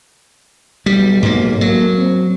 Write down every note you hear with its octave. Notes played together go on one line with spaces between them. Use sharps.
B1 G3
G#2 A#3
F#3 A#3
C4